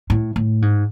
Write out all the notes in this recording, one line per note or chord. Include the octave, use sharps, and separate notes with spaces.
A2
A2
G#2